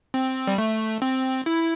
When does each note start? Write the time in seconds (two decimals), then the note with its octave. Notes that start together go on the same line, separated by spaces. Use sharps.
0.14 C4
0.47 G3
0.58 A3
1.02 C4
1.46 E4